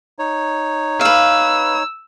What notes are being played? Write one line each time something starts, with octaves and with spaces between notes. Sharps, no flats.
D#4 C#5
B4 F5 E6